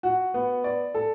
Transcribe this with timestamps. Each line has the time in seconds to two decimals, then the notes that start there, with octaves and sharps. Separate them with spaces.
0.03 F#4
0.34 B3
0.64 D5
0.94 A4